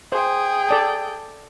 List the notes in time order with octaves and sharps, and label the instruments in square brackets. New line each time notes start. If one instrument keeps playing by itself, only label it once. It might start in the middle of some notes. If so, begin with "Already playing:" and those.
[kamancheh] G#4 G5 [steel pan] C5
[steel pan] A4 D5 A5